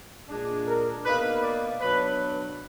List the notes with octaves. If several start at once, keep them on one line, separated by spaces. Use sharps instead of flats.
A#2 G#3 D4
A#4
B2 A#3 D#4 B4
D5
B2 F#3 D4 B4